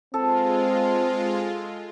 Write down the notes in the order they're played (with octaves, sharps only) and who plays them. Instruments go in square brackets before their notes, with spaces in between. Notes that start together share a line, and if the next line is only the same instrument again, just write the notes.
[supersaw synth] G#3 F4 [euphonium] C4 [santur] A4